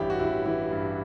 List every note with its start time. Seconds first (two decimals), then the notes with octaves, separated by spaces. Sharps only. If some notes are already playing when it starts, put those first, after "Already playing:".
Already playing: A1 G2 E3 D4 E4 G4
0.10 F#4
0.20 A1 E4
0.46 E3 E4
0.71 G2